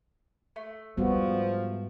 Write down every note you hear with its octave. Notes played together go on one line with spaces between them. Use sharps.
A3
G#2 F3 G3 B3 F#4